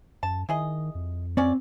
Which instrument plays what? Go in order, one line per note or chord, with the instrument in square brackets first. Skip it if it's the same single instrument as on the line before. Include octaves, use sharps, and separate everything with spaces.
[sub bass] F#2 [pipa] A5
[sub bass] D#3 [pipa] E4 G#4 D#5
[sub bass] F2
[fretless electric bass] C4 [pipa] C#4 F#4 D5